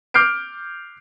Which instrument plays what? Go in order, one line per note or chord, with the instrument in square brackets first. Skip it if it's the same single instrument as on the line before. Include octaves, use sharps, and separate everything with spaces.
[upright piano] D6 F6 G6 C7 D7